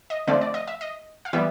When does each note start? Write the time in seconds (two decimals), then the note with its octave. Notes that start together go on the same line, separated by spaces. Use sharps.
0.10 D#5
0.27 D3 F3 A3 C4 D5
0.41 D5
0.54 D#5
0.67 E5
0.81 D#5
1.25 F5
1.33 E3 G3 B3 E5